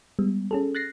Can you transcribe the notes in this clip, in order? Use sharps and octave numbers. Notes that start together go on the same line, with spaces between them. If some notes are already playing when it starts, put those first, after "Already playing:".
G3 G#3 B3
C#4 G#4 A4
F#6 A6 A#6 C7